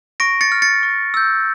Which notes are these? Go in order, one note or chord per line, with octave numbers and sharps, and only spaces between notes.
C#6 A#6 D7
A6 C#7
F6
A6 C#7
C#6
E6 G6